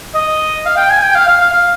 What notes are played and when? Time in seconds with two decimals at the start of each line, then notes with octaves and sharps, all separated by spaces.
0.15 D#5
0.66 F5
0.77 G5
0.90 G#5
1.03 G5
1.15 F5
1.28 F5
1.41 F5
1.53 F5